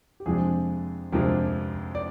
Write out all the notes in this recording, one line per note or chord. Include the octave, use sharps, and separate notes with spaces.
G4
F2 C3 F3 G#3 D4 G#4
F2 C3 F3 G#3 D4 A#4
D5